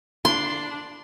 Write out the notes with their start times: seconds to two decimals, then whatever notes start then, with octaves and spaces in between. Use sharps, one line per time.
0.25 D4 C6